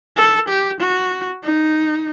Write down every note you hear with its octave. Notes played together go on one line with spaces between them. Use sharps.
A4
G4
F#4
D#4